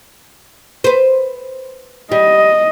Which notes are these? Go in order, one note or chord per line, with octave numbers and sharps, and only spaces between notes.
B4 C5
G3 D#5